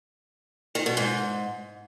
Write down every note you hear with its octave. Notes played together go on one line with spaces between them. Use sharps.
D#3
B2
G#2